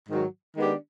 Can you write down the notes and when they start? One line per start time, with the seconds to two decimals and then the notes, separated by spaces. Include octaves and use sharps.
0.09 G#2 D#3 F#3
0.57 D#3 G#3 B3 D4 G4